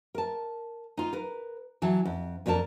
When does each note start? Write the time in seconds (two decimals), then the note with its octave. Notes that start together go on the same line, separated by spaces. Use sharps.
0.15 A#4 A5
0.97 D#4 F4
1.13 A#4 B4
1.82 E3 F#3 A5
2.05 F2
2.46 F2 D4 A4 A#4 A5